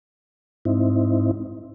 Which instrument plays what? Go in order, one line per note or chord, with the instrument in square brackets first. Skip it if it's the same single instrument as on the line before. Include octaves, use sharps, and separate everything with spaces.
[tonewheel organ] G#2 C4 D#4 E4